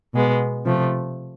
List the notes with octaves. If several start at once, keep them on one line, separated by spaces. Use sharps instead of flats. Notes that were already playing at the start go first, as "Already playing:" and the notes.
B2 G#3 B3
C3 F3 A3